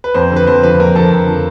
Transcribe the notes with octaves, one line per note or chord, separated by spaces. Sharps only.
B4
F2 C5
D3 F3 B4
F2 C5
D3 F3 B4
F2 A#4
D3 F3 A4
F2
D3 F3